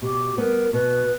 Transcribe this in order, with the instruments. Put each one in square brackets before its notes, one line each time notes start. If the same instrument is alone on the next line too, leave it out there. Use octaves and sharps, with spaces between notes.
[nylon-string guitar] B2 [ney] G4
[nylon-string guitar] G3 B3 [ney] A#4
[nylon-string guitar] B2 [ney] B4